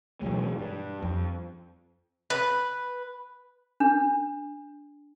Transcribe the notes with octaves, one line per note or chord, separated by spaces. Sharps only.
B2 E3 F#3 G#3
G2
F2
B4
D4